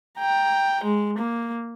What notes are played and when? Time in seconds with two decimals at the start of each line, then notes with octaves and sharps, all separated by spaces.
0.18 G5 A#5
0.84 G#3
1.18 A#3